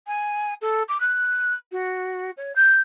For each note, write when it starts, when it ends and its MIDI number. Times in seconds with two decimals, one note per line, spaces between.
0.07 0.54 80
0.61 0.83 69
0.88 1.00 86
1.00 1.54 90
1.72 2.31 66
2.37 2.52 73
2.55 2.80 91